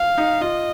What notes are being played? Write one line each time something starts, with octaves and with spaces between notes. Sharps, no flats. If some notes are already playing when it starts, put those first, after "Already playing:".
Already playing: F5
D#4
F4 D#5